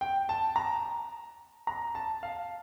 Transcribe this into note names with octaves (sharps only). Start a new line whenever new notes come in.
G5
A5
A#5
A#5
A5
F5